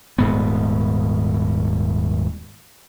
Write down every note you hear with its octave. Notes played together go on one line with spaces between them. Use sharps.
D#1 G#2 B3